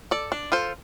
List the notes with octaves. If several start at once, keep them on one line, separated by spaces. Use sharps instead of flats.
A4 D5
D4
F4 A4 C5